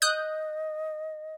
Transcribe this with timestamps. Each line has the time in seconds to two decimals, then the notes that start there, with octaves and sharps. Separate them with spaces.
0.02 D#5 D#6 F#6 G6